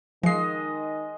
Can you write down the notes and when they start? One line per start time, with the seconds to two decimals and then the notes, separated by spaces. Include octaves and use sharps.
0.23 D#3 F3 G#3 D#5 C7